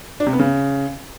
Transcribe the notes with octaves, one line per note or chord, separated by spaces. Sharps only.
D4
C3
B3
C#3